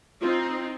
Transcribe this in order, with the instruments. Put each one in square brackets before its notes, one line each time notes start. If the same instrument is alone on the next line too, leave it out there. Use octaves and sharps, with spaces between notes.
[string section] C4 D#4 [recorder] F4